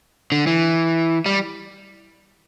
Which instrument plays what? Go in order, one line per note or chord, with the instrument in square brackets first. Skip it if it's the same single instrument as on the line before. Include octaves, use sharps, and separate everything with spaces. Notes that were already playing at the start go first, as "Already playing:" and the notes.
[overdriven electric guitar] D3
E3
G3